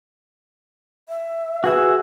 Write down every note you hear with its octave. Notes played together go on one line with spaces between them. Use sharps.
E5
F#4 G#4 B4 E5